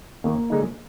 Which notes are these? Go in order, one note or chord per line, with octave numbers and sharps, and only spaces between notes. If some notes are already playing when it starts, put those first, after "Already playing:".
D#2 A#3
D3 G#3 D#4